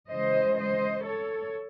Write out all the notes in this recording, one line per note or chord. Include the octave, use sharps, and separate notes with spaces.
C#3 E3 G#3 C5 D#5
C5 D#5
A4 C#5